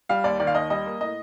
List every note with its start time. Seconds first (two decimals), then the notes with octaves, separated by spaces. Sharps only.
0.09 G3 F5
0.24 D#2 D5
0.40 D#3 D5
0.47 F5
0.55 D#2 D#5
0.70 G3 D#5
0.86 A#3
1.01 A2 D#5